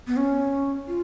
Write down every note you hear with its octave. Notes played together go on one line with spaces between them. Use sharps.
B3
C#4
F4